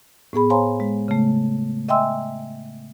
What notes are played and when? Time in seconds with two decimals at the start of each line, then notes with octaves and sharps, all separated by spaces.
0.33 A2 B3 G#4 B5
0.50 C5 C#5 F5 G#5 A#5 C6
0.80 G#3
1.08 C#3 A3
1.89 D#5 E5 G5 G#5 C6 E6